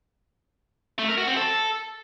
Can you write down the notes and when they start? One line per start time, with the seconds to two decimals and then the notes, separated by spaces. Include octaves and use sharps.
0.99 A3
1.08 A#4
1.18 F#4
1.27 C4
1.37 A4